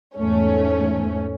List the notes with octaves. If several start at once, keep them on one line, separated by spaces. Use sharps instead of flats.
E2 G#2 A3 C#4